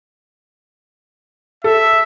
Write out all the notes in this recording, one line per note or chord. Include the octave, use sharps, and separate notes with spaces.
A4 E5